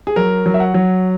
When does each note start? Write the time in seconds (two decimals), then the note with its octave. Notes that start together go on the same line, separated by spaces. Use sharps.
0.07 G#4
0.16 F#3 A#4
0.46 F#3
0.54 E5
0.60 F#5
0.74 F#3